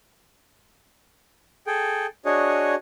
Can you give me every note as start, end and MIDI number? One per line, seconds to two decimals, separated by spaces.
1.67 2.06 68
1.67 2.06 69
1.67 2.06 79
2.25 2.75 62
2.25 2.75 66
2.25 2.75 68
2.25 2.75 73
2.25 2.75 75